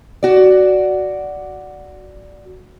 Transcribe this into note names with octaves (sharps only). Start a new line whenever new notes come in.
F#4 D5